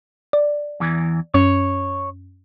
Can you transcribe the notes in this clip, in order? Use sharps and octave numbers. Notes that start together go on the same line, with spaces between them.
D5
E2 E3
F#2 C#4 C#5